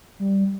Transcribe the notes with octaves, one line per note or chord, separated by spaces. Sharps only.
G3